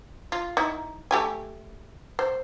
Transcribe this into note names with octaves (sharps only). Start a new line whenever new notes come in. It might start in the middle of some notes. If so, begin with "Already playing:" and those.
F4
D#4 E4
A3 G4 G#5
C5